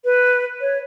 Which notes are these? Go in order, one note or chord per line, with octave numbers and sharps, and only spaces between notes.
B4
C#5